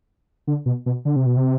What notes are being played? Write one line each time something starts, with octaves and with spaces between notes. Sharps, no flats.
D3
B2
B2
D3
C3
B2
C3